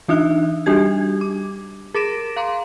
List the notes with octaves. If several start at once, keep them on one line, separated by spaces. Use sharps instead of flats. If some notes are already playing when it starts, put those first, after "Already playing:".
E3 D4 D#4 E5 F#6
G3 D4 F#4 G4 G#6
D6
G#4 A#4 D6 A#6 D7 E7
F5 A#5 C6 D6